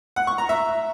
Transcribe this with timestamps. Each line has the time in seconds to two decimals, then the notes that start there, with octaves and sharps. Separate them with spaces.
0.16 F#5
0.27 C#6
0.38 A#5
0.49 E5